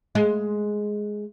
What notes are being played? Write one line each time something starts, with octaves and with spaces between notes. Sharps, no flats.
G#3